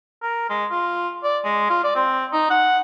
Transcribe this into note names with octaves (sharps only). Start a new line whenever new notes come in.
A#4
G#3
F4
D5
G#3
F4
D5
C4
D#4
F#5